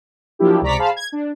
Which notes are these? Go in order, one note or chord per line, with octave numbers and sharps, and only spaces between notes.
F3 F#3 A#3 D4 E4 G4
C#2 C3 D5 A#5 C#6 B6
G#4 C5 F5 A5 B5
G#6
D4